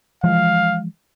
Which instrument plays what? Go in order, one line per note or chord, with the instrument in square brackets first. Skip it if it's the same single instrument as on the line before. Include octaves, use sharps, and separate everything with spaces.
[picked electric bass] E3 F3 G#3 [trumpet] F5